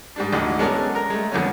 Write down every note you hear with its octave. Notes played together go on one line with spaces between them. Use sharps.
G#2 G3 D4
A1 D2 D3 D#4
G#3 B3 C#4 A4 A#4 D5
A#4 A#5
G#3 A3
F2 D3 B3 C#4